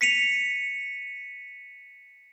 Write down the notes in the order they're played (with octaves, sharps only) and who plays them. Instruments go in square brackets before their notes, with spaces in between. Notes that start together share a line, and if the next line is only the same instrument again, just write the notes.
[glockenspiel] B6 C#7 D#7 F7